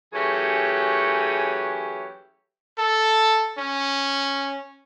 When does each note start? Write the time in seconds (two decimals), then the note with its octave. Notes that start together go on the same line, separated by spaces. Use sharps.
0.13 E3 F#3 A3 C#4 G4 G#4
2.78 A4
3.58 C#4